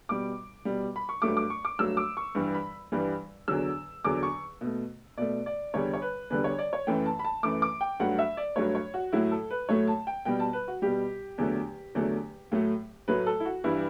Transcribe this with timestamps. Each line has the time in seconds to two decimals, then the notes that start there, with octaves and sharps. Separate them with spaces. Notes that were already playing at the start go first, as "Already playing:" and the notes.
0.09 B2 G3 D6
0.65 B2 G3
0.96 B5
1.09 C#6
1.22 G2 F#3 A3 D6
1.37 D6
1.50 C#6
1.65 D6
1.79 G2 F#3 A3 E6
1.97 D6
2.17 C#6
2.35 G2 E3 G3
2.54 B5
2.92 G2 E3 G3
3.48 E2 D3 F#3 E6
4.04 E2 D3 F#3 D6
4.23 C#6
4.61 B2 A3
5.18 B2 A3 D5
5.46 D5
5.74 E2 D3 G3 C#5
5.94 C#5
6.02 B4
6.30 E2 D3 G3 B4
6.44 C#5
6.59 D5
6.73 C#5
6.87 F#2 E3 A3 G5
7.06 A5
7.19 B5
7.25 A5
7.43 F#2 E3 A3 D6
7.62 D6
7.81 G5
8.00 G2 F#3 A3 F#5
8.19 E5
8.37 D5
8.56 G2 F#3 A3 C#5
8.75 C#5
8.94 F#4
9.12 A2 F#3 A3 E4
9.31 A4
9.51 B4
9.69 A2 F#3 A3 C#5
9.87 A5
10.07 G5
10.25 B2 G3 G5
10.40 A5
10.53 B4
10.68 F#4
10.82 B2 G3 G4
11.38 E2 D3 F#3 A3
11.95 E2 D3 F#3 A3
12.52 A2 F#3 A3
13.08 A2 F#3 A3 B4
13.27 A4
13.40 E4
13.45 F#4
13.64 G2 E3 G3 E4